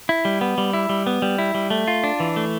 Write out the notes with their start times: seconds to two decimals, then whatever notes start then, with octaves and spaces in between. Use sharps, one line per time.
0.09 E4
0.25 G3
0.41 B3
0.58 G3
0.73 E4
0.89 G3
1.07 B3
1.22 G3
1.38 E4
1.55 G3
1.70 A3
1.88 F4
2.04 D4
2.20 E3
2.36 A3